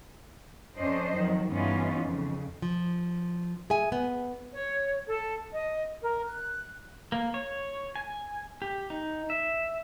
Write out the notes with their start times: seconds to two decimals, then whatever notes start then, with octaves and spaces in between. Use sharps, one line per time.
0.78 F2 C#4 D4 C5 D#5
1.14 F2 D#3 F#3
1.51 G2 E3 B3 C#4 D#4 F4
2.02 F2 C#3
2.62 F3
3.70 G#4 E5 G#5
3.92 B3
4.53 C#5
5.06 A4
5.52 D#5
6.02 A#4
6.25 F#6
7.12 A#3
7.34 C#5
7.96 G#5
8.62 G4
8.90 D#4
9.30 E5